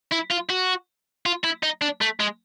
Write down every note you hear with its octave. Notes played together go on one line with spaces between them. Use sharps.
E4
F4
F#4
F4
E4
D#4
D4
A3
G#3